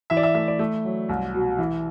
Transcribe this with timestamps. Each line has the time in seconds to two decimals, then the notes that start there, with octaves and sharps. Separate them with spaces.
0.10 E3 E5
0.17 D5
0.23 E5
0.35 A3 E5
0.48 D5
0.59 A3
0.85 F#3
1.09 C2
1.34 B2
1.59 E3